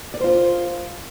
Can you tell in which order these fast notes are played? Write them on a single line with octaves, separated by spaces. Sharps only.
D5 A#4 C5 F4